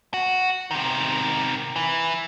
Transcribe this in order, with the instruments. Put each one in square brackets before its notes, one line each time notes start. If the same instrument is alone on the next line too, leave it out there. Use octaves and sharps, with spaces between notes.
[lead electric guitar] F#4
C3 D#3
E3